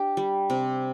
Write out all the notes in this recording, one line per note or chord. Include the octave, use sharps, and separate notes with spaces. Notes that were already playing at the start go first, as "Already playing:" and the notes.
Already playing: D4 G4
G3
C3